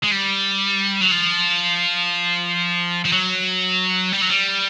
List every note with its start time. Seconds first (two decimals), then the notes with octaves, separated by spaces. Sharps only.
0.03 G#3
0.11 G3
1.01 F#3
1.11 F3
3.05 F3
3.12 F#3
4.12 G3
4.21 F#3
4.30 G3